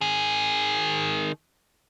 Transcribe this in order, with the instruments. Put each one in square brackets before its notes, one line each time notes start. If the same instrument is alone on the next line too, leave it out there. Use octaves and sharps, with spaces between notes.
[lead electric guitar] D#3 G#4